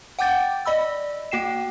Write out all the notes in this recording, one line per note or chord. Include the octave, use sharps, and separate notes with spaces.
F#5 G5 D6 G6 A6
D5 D#5 B5 E6
A#3 F#4 G5 C7 E7